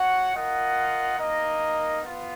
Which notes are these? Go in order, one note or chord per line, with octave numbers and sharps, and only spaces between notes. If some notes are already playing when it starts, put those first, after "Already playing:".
Already playing: F#4 C#5 F#5
F4 A#4 D#5 F#5
A#3 D#4 A#4 D#5
B3 F4